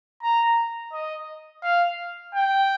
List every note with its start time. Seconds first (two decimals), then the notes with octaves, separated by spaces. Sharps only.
0.23 A#5
0.93 D#5
1.64 F5
2.35 G5